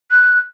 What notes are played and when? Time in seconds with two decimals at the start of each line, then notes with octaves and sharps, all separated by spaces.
0.11 F#6